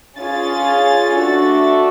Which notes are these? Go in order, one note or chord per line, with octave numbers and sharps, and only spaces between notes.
C#4 F4 G#4 A6
A3 D4 F#4 A4